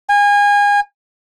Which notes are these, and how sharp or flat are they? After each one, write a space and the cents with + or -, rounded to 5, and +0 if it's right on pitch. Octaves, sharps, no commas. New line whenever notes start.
G#5 -30